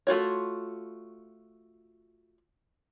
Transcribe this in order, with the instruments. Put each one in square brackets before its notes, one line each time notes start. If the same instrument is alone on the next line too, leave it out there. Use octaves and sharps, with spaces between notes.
[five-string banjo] A3 F4 F#4 C#5